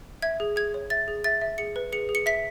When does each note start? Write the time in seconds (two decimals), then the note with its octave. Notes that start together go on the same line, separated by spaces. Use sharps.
0.22 E5 G#6
0.40 G#4
0.56 G#4 G#6
0.74 C#5
0.90 E5 A6
1.08 G#4
1.24 E5 A6
1.41 E5
1.58 G#4 C#7
1.76 B4
1.92 G#4 C#7
2.09 G#4
2.15 C#7
2.26 E5 B6